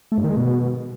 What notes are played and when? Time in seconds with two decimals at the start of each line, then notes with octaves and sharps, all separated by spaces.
0.12 A3
0.18 G2
0.24 D#3
0.30 G#3
0.37 B2